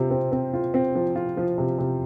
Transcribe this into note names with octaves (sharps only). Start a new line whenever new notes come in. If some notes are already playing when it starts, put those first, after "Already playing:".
Already playing: C3 C4 F4
C4
C4
F4
C4
F3
F4
F3
C3
C3